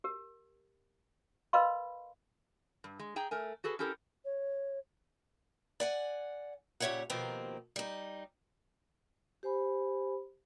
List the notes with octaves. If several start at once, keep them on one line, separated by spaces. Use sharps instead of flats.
G4 A#4
A#4 B4 D#5 F5 B5 C6
G2
G#3
G#4 G5 A#5
A3 A#4 G#5
F#4 G#4 A4 B4
C#4 E4 G4 A4 A#4
C#5
D5 F#5 G#5
A#2 C#3 G4 C#5 E5 F#5
B2 D#3 F3 A#3 C4 G4
G3 D#4
G4 C5 G#5 B5